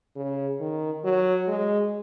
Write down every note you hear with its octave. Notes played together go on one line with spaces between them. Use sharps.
C#3
D#3
F#3
G#3